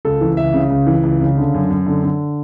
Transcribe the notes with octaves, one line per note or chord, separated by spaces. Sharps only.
C#2 A4
E3
C#2 E5
C#3
C#2
E3
C#2
C#3
D3
F#2
F#2
D3
D3